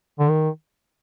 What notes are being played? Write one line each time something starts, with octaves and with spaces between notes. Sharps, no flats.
D3
D#3